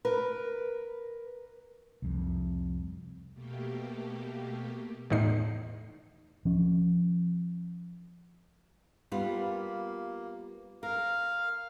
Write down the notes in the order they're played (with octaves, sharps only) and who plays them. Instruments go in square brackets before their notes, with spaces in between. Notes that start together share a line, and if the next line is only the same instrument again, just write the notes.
[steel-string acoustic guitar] A#4 B4
[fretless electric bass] C2 F2
[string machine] B2 A3 A#3 G4
[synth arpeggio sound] E2 A2 D#4 C7
[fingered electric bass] F3 C#4
[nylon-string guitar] G3 B3 F4
[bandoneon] A#3
[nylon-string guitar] A#4 [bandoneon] F5